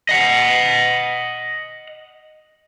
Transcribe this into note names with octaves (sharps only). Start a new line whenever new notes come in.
D#5 F#5